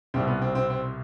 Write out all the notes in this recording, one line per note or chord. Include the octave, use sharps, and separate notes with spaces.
C2 B2 G3 C4
B3
C4
C4
C4